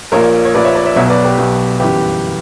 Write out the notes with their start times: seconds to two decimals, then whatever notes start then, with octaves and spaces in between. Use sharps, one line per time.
0.12 A#1 A#2 A#4 C#5
0.45 C#5
0.54 A#1 A#2 B4 D5
0.64 C#5 E5
0.75 B4 D5
0.85 C#5 E5
0.96 B1 B2 C#5 E5
1.10 B4 D5
1.25 G4 B4
1.38 B1 B2
1.80 G1 F#2 E3 G4 B4